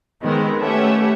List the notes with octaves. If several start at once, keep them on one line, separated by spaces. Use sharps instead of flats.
D#3 G#3 B3 C4 A#4
A3 C#4 G4 B4 E5 F#5